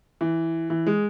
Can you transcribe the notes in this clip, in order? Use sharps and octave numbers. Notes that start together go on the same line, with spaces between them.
E3
E3
G#3